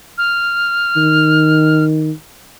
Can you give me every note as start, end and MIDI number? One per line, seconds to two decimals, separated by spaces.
0.18 1.84 89
0.97 2.11 51